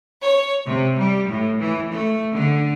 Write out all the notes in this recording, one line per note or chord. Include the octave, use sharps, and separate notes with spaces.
C#5
C3
G3
A2
E3
A3
D3